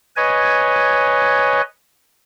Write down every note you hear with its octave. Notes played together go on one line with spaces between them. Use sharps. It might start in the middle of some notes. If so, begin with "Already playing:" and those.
B4 C#5 D#5 G#5